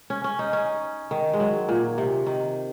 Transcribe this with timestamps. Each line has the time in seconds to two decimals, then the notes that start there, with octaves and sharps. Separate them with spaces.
0.10 C#4
0.24 C#4
0.39 D#4
0.53 C#4
1.11 D#3
1.33 G#3
1.40 F#3
1.69 A#2
1.98 C3
2.27 D#3